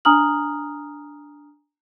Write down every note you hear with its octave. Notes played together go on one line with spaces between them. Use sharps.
D4 G#5 A#5 D#6 F6 F#7